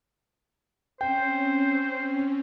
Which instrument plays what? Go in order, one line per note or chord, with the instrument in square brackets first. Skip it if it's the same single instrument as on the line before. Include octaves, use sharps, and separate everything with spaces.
[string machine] C4 C#4 [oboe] C5 [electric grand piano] G5